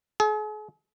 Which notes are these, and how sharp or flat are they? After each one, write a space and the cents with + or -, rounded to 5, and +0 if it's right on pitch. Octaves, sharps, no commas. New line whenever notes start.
G#4 +40